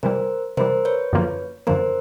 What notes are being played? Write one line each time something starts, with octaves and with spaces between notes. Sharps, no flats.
C3 E3 G3 A#4 C5
C3 E3 G3 A#4 C5
B4 C#5
F#2 D3 F3 A#3
F#2 D3 F3 A#3 A#4 C5